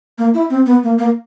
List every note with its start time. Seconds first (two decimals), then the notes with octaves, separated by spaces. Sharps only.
0.18 A#3
0.34 E4
0.50 C4
0.66 B3
0.83 A#3
0.98 A#3